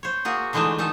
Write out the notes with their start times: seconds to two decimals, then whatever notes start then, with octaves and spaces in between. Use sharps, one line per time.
0.03 C5 C#5
0.25 A#3 F#4 G#4
0.53 D3 E3 G#3 A3 D4 D#4
0.78 D#3 D#4 A4